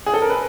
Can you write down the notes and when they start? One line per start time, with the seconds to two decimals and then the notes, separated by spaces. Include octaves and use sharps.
0.06 G#4
0.14 A4
0.22 A#4
0.30 B4